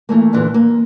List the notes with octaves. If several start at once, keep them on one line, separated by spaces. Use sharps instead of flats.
E3 A3 A#3
A#2 D3 E3
A#3